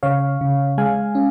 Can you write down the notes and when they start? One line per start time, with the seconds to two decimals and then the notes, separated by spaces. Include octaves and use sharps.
0.03 C#3 C#5 F5
0.41 C#3
0.78 G#3 F5 G#5
1.15 C#4